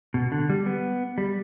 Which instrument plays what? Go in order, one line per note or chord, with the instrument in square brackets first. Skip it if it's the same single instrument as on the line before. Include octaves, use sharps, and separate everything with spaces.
[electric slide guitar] B2
D3
G3
B3
G3